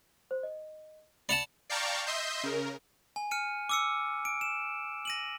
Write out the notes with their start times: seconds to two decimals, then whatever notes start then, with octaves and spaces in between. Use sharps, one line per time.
0.31 C5
0.43 D#5
1.29 D5 F#5 A5 B5 C#7 F7
1.70 D5 F5 G5 A5 A#5 C#6
2.07 D#5 E5 C6 G6
2.43 C#3 A#4
3.16 G#5
3.31 F6 C#7 D#7
3.69 D6 E6 C#7
4.25 D7
4.41 E7
5.05 A#6 D#7 F#7